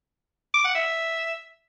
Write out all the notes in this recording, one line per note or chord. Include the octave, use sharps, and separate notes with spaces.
D6
F#5
E5